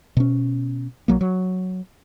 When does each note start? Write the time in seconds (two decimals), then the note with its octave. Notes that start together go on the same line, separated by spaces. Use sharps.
0.17 B2 C#4
1.08 B1 F#3 A#3
1.21 F#3